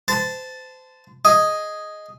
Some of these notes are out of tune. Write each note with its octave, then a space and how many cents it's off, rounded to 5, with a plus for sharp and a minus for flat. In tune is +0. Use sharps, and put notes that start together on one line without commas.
C5 -30 A5 +0
G#4 +0 D#5 +0